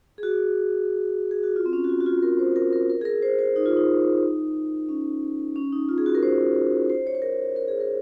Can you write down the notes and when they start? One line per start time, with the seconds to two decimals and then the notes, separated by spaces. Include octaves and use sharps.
0.18 G#4
0.23 F#4
1.31 G#4
1.43 F#4
1.56 F4
1.66 C4
1.73 C#4
1.84 F#4
1.89 F4
2.00 F#4
2.06 F4
2.22 A#4
2.39 C5
2.56 A#4
2.73 A#4
2.90 A#4
3.01 G#4
3.05 A#4
3.22 C5
3.39 C5
3.56 D#4
3.66 F4
3.77 D#4
4.89 C#4
5.56 C#4
5.73 D#4
5.89 F4
5.98 G#4
6.06 F#4
6.15 A#4
6.23 C5
6.90 C5
7.07 C#5
7.15 C5
7.22 A#4
7.56 A#4
7.68 G#4
7.80 A#4